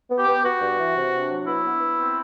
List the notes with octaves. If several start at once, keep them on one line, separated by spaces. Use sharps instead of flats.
B3
G4
B3
B3 F#4
G2
E3
C3
D4
F#3
B3 E4
B3
B3
C4